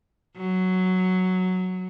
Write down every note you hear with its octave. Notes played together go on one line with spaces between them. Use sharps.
F#3